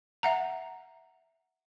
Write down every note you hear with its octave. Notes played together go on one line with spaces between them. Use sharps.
E5 F#5 A#5